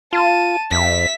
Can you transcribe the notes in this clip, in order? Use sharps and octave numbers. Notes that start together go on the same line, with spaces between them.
F4 A5 D#7
F2 E5 B6